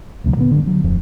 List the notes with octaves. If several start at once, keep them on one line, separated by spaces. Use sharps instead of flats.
A1 D2 C3 F#3
A#2 D3 G#3 B3
G2 D3
D3 F#3
D1 F2 F3